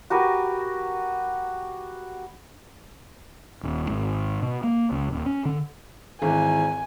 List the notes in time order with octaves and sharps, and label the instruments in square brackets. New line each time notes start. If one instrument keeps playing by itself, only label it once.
[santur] F#4 G4 A#4 B4
[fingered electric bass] D#1
G#1
B2
A#3
C#2
D#1
C#4
D3
[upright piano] G#1 E3 [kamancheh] G#5